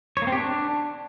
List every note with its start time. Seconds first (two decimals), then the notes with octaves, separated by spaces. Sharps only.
0.17 C#5
0.22 A#3
0.27 C4
0.32 G4
0.37 D4